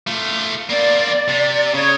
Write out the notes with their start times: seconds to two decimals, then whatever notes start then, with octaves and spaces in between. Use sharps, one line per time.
0.07 A3 F4
0.69 A#3 C4 D5
1.29 C3
1.74 C#3 C#5